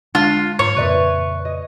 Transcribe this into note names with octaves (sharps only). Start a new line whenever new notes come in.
D3 G#3 D4 F4
G#2 F#3 C5 C#5
F2 A#2 C#3 A#4 B4 D5 E5
D#5